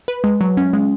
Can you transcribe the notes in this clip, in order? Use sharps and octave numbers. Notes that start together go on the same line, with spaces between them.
B4
G#3
F#3
C#4
G#3